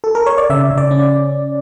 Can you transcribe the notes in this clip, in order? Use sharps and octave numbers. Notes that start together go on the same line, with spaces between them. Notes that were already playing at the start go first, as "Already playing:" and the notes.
A4
A#4
C#5
D5
C#3 E5
C#3
D5
C#4